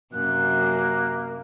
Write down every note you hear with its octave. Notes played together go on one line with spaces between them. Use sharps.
F#2 C3 A#3 F#6